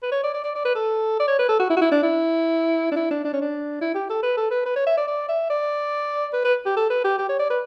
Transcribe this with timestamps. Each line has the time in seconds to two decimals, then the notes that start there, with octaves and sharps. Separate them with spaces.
0.03 B4
0.12 C#5
0.24 D5
0.34 D5
0.44 D5
0.55 D5
0.65 B4
0.75 A4
1.20 D5
1.28 C#5
1.39 B4
1.49 A4
1.60 F#4
1.70 E4
1.77 F#4
1.81 E4
1.92 D4
2.03 E4
2.92 D4
2.96 E4
3.11 D4
3.25 D4
3.34 C#4
3.41 D4
3.81 E4
3.95 G4
4.10 A4
4.23 B4
4.37 A4
4.51 B4
4.66 B4
4.76 C#5
4.87 E5
4.97 D5
5.08 D5
5.29 E5
5.50 D5
6.33 B4
6.45 B4
6.66 G4
6.77 A4
6.90 B4
7.04 G4
7.18 G4
7.29 C#5
7.39 D5
7.50 B4